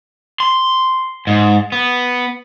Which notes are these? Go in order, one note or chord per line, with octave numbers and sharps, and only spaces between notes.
C6
G#2
B3